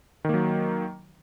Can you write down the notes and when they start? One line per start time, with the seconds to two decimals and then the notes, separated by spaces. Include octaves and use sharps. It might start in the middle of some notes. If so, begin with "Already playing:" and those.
0.25 D#3
0.29 A#3
0.34 F#3